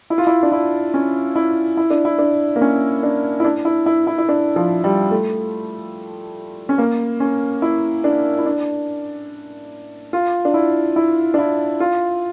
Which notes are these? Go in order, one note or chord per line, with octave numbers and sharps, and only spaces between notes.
E4
F4
E4
D4
E4
C#4
E4
E4
D4
E4
D4
A#3
C#4
D4
E4
D4
E4
E4
E4
E4
D4
F3
G3
A3
C#4
A#3
C#4
E4
D4
E4
D4
F4
D4
E4
E4
D4
E4
F4